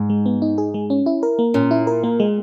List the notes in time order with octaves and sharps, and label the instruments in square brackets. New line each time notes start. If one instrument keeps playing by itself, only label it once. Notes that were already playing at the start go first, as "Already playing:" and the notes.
Already playing: [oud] G#2
[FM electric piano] G#3
B3
D#4
G#4
G#3
C#4
E4
A#4
A#3
[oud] A#2 [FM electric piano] C#4
[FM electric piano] E4
A#4
A#3
G#3